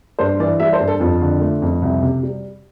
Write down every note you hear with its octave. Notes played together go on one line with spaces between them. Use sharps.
G2 C5
E3 D5
G3 E5
C5
G2
A4
F2 F4
D3
A3
F2
C2
C3
G3